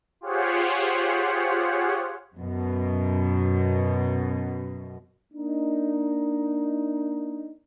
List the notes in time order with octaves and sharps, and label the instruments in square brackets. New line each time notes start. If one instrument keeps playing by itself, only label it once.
[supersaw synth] F4 G4 G#4 C5 C#5 F#5
[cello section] F#2 B2
[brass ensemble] A#3 D4 D#4